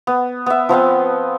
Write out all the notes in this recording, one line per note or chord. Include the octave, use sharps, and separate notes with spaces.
B3
B3 E5
F3 B3 C4 F5